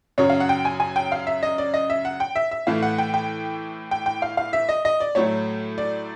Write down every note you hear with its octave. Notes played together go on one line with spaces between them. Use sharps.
F#2 C#3 F#3 C#5
F5
F#5
G5
G#5
G#5
G5
F5
E5
D#5
D5
D#5
E5
F#5
G5
E5
E5
A2 E3 A3 F5
F#5
G5
G5
G5
G5
F5
F5
E5
D#5
D#5
D5
A2 F#3 A3 C#5
D5